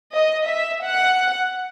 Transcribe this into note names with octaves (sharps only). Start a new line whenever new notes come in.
D#5
E5
F#5